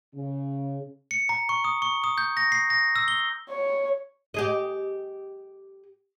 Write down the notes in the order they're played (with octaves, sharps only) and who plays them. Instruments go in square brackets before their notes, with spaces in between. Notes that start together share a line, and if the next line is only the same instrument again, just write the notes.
[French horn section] C#3
[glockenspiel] C#7
A#5
C#6
D#6
C#6
D#6
G6
A#6
C7
A#6
E6
G7
[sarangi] C#5
[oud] G4 G#4 D#5